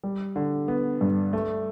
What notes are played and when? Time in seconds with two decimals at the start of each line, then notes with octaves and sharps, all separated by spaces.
0.04 G3
0.36 D3
0.68 B3
1.01 G2
1.33 A3